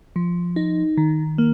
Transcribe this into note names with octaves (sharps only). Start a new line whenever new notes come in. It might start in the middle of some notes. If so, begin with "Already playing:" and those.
F3
D#4
D#3
A#3